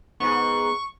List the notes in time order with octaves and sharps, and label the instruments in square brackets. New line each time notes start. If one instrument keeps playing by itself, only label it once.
[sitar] G#2 G#4 [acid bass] B3 [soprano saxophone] C#6